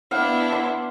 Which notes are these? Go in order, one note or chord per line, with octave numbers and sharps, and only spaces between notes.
B3 D4 E4 F5 F#5
C6